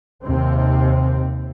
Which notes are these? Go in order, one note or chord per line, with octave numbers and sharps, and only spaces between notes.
D#2 C3 C4